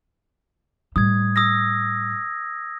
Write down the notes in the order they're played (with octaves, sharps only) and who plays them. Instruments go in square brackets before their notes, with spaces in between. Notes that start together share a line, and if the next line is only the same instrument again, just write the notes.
[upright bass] A2 G3 [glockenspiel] D#6 G#6
[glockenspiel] D#6 E6 A#6